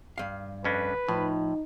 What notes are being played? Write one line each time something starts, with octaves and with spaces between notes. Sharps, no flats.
G2 F5
F2 C#4 D4 B4
A2 F3 D#4